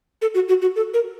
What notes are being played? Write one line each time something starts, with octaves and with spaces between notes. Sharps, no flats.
A4
F#4
F#4
F#4
A4
A#4